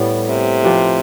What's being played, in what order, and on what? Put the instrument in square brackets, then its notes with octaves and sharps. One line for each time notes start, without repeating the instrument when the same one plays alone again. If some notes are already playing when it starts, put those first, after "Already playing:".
Already playing: [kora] A2 G3 A3 B3 E4
[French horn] C3
[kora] F3 C4 G4 B4